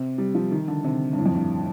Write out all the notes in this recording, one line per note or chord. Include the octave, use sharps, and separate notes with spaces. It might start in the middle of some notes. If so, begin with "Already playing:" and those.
Already playing: C3
G3
F3
D#3
D3
C3
G2
A2
F2
G2